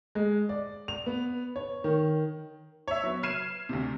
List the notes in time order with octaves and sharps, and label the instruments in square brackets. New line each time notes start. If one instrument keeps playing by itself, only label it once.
[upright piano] G#3
D5
F7
B3
C#5
D#3
[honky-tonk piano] C#5 E5
F#3 B3
F6 G#6 C7 D#7 E7
D2 C3